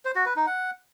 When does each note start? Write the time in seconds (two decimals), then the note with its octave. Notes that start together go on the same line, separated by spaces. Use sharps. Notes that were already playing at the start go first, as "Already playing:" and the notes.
0.05 C5
0.15 F#4
0.26 B4
0.36 D#4
0.47 F#5